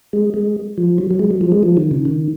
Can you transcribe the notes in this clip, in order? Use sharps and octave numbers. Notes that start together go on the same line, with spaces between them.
G#3
G#3
F3
F#3
F#3
G#3
F#3
F3
G#3
F3
D#3
C#3
D#3